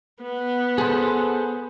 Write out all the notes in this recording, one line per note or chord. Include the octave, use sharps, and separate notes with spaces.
B3
G#4 A4 C5